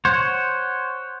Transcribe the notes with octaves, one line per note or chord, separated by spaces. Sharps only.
C5 C#5 F#5